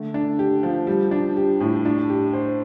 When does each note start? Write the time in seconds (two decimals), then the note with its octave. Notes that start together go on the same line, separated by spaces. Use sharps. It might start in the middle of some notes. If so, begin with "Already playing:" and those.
Already playing: D3 A3
0.14 D4
0.39 G4
0.63 F3
0.87 G3
1.11 D4
1.37 G4
1.60 A2
1.85 D4
2.10 G4
2.33 C5